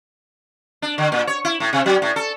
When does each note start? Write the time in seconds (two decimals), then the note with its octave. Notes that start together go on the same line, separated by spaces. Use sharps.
0.82 D4
0.98 D3
1.12 A#2
1.27 C#5
1.45 E4
1.60 A2
1.73 C3
1.86 F#3
2.02 A2
2.16 A4